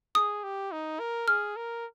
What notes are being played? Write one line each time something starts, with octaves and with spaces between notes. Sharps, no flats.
G#4 D#6
G4
D#4
A#4
G#4 F6
A#4